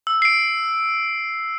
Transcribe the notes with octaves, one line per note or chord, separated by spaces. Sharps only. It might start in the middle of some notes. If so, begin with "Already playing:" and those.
E6
C7 D7